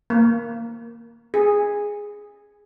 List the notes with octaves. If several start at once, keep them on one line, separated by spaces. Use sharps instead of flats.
A#3
G#4